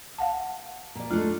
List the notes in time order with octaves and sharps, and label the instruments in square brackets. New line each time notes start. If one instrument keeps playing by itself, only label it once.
[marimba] F5 F#5 A5
[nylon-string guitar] A#2 D5
[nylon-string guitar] G#3 A3 D4 [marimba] F4